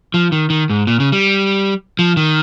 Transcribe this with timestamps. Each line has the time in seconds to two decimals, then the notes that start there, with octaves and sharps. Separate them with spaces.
0.14 F3
0.32 D#3
0.50 D#3
0.70 G#2
0.87 A#2
1.00 C#3
1.12 G3
1.99 F3
2.17 D#3